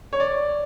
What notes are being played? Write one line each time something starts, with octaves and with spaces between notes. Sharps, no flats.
C#5
D5